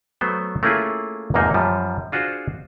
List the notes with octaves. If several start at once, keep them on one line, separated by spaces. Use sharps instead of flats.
F#3 A3 B3 C5
A3 A#3 C#4 E4 F4 G#4
E2 G#2 C3 F3 A#3 D#4
F#2 F3 G3
D4 F4 F#4 G#4 C5